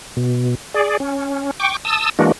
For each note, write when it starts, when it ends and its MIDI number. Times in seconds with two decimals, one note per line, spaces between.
0.17 0.55 47
0.74 0.97 68
0.74 0.97 74
1.00 1.51 61
1.60 1.77 79
1.60 1.77 85
1.60 1.77 86
1.85 2.10 81
1.85 2.10 87
1.85 2.10 88
2.19 2.32 52
2.19 2.32 56
2.19 2.32 58
2.19 2.32 62
2.19 2.32 66